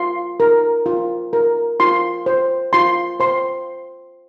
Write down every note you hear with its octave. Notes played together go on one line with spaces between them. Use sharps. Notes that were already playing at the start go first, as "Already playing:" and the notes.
Already playing: F4 C6
A#4
F4
A#4
F4 C6
C5
F4 C6
C5 C6